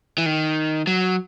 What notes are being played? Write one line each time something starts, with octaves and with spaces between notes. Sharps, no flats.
E3
D#3
F#3